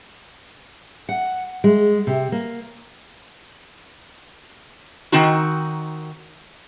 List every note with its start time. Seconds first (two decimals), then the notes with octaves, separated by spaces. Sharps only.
1.09 F#5
1.64 G#3
2.07 C3
2.32 A#3
5.12 D#3 C4 D#4 F#4